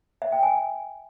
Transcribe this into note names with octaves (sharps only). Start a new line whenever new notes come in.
E5
G5
G#5